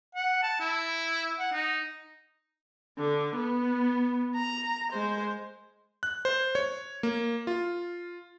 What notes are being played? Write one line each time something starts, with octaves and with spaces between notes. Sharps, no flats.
F#5
A5
E4
F#5
D#4
D3
B3
A#5
G#3 C5
F#6
C5
C#5
A#3
F4